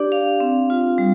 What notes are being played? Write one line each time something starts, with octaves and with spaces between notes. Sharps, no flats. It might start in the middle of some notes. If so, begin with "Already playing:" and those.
Already playing: D4 G4 D5
F5
C4
F4
G3